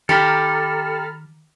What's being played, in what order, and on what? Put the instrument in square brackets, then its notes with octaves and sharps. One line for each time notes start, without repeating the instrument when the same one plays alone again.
[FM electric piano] D#3 [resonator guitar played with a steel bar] G4 [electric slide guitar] A4 [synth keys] A#5 B5 F6